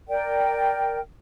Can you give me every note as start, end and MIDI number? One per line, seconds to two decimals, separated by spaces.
0.08 0.99 70
0.08 0.99 74
0.08 0.99 79